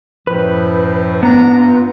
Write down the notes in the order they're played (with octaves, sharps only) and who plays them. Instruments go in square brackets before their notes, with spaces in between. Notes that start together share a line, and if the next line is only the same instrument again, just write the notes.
[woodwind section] F#2 A2 F3 [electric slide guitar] B4
[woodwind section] G#2 D4 A#5 [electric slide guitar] B3
[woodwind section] G2 F4